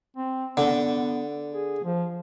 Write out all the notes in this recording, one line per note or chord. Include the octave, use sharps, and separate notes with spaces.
C4
D3 B3
G#4
F3